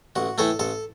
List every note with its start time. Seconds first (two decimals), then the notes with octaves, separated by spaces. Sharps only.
0.16 A1 F#4
0.38 A2 E3 A3 A4
0.59 A1 A4